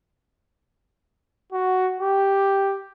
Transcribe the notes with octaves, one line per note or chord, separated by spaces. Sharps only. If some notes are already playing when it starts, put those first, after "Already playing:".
F#4
G4